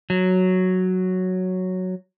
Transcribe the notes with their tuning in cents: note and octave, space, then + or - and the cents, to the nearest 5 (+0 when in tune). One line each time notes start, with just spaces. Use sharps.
F#3 +0